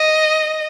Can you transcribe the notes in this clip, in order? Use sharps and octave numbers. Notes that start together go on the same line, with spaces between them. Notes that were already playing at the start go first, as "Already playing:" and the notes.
Already playing: D#5